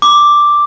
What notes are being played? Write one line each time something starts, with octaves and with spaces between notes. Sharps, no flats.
D6